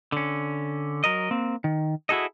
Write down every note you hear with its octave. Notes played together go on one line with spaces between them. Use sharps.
D3 C#4
F#3 A#4 D#5
A#3 C4
D#3
E4 F#4 G#4 A4 D#5